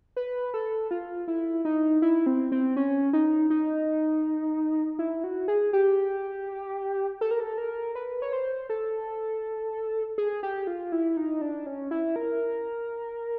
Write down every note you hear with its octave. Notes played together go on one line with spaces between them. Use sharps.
B4
A4
F4
E4
D#4
E4
C4
C4
C#4
D#4
D#4
E4
F#4
G#4
G4
A4
A#4
A4
A#4
B4
C#5
C5
A4
G#4
G4
F4
E4
D#4
D4
C#4
E4
A#4